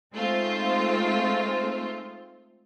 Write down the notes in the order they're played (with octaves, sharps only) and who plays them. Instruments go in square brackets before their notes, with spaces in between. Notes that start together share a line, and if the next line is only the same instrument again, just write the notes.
[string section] G#3 A3 C4 D#4 F4 C5